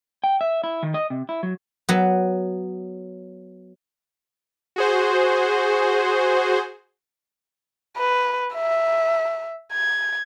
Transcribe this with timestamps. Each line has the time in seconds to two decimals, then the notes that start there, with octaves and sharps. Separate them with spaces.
0.24 G5
0.41 E5
0.64 E4
0.83 D#3
0.94 D#5
1.10 C3
1.29 E4
1.43 F#3
1.89 F#3 B3
4.76 F#4 G#4 C5
7.97 B4
8.54 E5
9.72 G#6